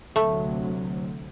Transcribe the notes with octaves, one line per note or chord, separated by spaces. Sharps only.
D2 C3 F#3 A3